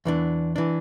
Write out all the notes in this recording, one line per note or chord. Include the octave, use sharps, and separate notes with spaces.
E2 E3 D4
E3 D4